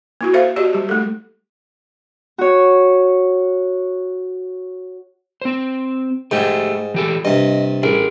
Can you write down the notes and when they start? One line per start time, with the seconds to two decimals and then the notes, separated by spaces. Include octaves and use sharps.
0.21 A#3 E4 F#4
0.33 A4 C5 E5 F5
0.56 F#4 G4 D5 D#5
0.73 G3 G4
0.89 A3 A4
2.38 F#4 C#5
5.42 C4 C5
6.31 G#2 A3 G4 G5
6.94 E3 G4 A4
7.25 G2 C3 D#5
7.83 A1 G#4 A#4